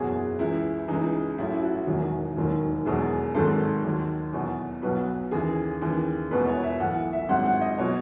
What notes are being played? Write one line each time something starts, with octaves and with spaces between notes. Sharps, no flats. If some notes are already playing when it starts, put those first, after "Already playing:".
Already playing: F#1 E2 B2 F#3 G#4
C#2 C#3 E3 E4
C#2 C#3 E3 D#4
A1 A2 F#3 E4
F#4
E1 E2 D#3 F#3
E1 D#2 D#3 F#3
E1 E2 B2 F#3 G#4
G#1 G#2 D#3 F#3 A4
D#2 D#3 F#3
E2 B2 F#3
B1 B2 F#3 B4
D#2 C#3 E3 G#4
D#2 C#3 E3
E1 E2 B2 B4
C#5
E5
B1 A2 E3 F#5
E5
G#1 G#2 F#3 F#5
F#5
D#5
B2 F#3 C#5